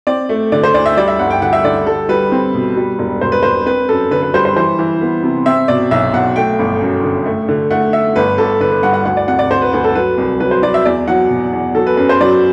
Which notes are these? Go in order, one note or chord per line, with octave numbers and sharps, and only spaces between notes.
C4 D5
A3
D3 D5
C5
D2 D5
E5
G3 D5
E5
G1 F#5
G5
D3 F#5
E5
D3 D5
G3 A4
G3 B4
C4
B2
G3
E1
E1 C5
B4
E1 C5
C4 B4
F#2 A4
D3 B4
B4
G3 C5
C5
E3 C5
E3
B3
C3
C4 E5
B2 D5
B1 E5
B1 F#5
A3 G5
G1
F#2
D3
A3
D3
A3 F#5
A3 E5
G1 B4
G1 A4
D3 B4
B4
G2 F#5
F#5
D2 F#5
D5
C3 F#5
D5
D2 C5
B4
D2 B4
A4
F#3 B4
C2
F#3 B4
C5
F#3 D5
E5
E2 D5
F#3 F#5
B2
E2
F#3 A4
B4
F#2 B4
C5
F#3 D5